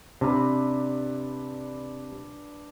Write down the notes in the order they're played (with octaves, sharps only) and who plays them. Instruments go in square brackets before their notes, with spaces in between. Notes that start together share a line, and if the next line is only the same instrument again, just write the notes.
[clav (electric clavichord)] C3 [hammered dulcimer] D4 B4